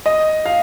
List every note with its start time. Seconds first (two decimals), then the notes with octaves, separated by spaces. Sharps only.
0.06 D#5
0.45 F5